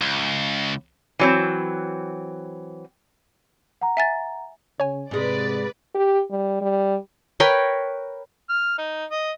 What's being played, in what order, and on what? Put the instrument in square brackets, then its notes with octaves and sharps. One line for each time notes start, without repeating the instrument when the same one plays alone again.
[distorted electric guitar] C#2
[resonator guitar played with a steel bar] E3 F#3 C4
[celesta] F#5 A#5
[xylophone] E5 G#5 A6
[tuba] C#3 [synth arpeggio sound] C#5 G#5
[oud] G#2 G#3 [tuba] C3 [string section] B4 D5
[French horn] G4
G3
G3
[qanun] A#4 B4 C#5 G5
[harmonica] F6
D#4
D#5